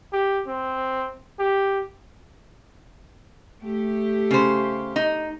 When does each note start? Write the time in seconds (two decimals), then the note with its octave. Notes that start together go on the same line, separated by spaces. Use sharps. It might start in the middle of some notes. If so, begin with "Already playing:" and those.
0.13 G4
0.47 C4
1.39 G4
3.62 A3 G4
4.31 C#3 C5
4.96 D#4